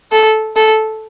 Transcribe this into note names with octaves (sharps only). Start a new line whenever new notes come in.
A4
A4